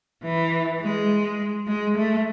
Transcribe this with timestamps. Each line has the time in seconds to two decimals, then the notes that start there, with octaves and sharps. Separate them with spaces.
0.23 E3
0.81 G#3
1.67 G#3
1.97 A3